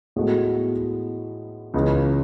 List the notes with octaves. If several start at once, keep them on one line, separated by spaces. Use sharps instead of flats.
A2 G#3 B3 F#4 A4
C#2 C#3 E3